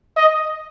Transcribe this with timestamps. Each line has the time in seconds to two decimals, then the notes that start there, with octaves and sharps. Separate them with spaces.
0.17 D#5